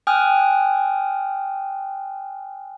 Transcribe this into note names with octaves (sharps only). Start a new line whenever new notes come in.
G5 G#5 D#6 F6 F#6